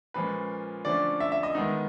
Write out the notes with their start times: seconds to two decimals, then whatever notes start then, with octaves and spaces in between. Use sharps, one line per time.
0.14 A#2 F3 G#3 C#4 B4
0.85 D3 F3 A3 C#4 D5
1.20 E5
1.32 E5
1.43 D#5
1.55 D#3 G#3 B3 D#4